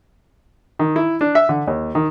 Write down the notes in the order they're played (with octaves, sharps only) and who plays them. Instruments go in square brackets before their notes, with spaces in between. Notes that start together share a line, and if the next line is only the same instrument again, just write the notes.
[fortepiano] D#3
E4
D4
E5
D3
D#2
D#3